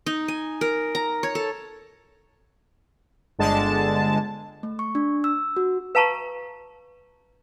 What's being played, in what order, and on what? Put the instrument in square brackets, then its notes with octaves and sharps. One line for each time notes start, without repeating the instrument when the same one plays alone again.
[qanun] D#4
G#5
A#4
A#5
C#5
A4
[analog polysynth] G1 D3 G#3 A5
[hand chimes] A3
C#6
D4
E6
F#4
[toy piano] B4 F5 A5 A#5 C#6